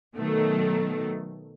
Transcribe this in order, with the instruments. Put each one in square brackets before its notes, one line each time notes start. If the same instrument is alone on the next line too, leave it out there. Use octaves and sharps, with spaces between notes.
[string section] B2 D#3 F#3 A3